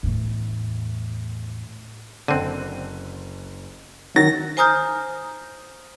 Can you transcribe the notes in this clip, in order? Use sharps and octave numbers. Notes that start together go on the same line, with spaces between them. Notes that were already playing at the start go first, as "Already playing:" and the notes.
E2 A2
F#1 D3 C4 F#6 D#7
D#3 F#3 A6 A#6
C5 G#5 A#5 D#6 F6 G6